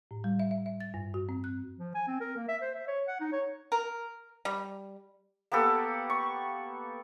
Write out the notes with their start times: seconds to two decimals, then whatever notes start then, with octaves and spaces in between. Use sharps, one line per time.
0.11 A2
0.24 G3
0.39 E5
0.51 E5
0.66 E5
0.80 A6
0.94 G2
1.14 F#4
1.29 C4
1.44 F#6
1.79 F3
1.95 G#5
2.07 C4
2.21 A#4
2.36 A#3
2.48 E5
2.62 C5
2.74 E5
2.87 C#5
3.08 F#5
3.20 D#4
3.32 C#5
3.72 A#4
4.45 G3
5.52 A#3 B3 G4 A4
6.10 C#6